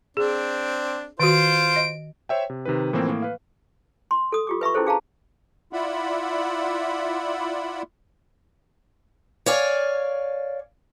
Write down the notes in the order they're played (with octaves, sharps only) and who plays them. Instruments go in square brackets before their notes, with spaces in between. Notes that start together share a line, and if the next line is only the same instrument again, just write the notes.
[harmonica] C4 D4 [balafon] G#4
[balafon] D#3 F#4 [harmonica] F4 C5 [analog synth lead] D7
[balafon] D#5
[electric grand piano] C5 C#5 E5 G5
C3
C3 D#3 D#4 B4
A2 E3 F3 A#3 C4
A2 A#3
B4 F5
[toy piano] C6
A4 D#6
F4 G4 D6
B4 E5 B5 C#6
C#4 D#4 E4 G#4 A4 C5
D4 G#4 F5 A5 A#5
[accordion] E4 F4 D5 E5 F#5 B5
[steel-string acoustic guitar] C#5 D5 F5 G#5